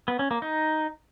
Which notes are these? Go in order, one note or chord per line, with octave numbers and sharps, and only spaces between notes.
B3
C#4
A#3
D#4